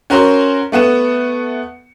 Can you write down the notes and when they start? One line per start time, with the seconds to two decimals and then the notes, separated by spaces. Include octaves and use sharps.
0.10 C#4 F#4 A#4 C5 C6
0.72 A3 B3 F#5 E7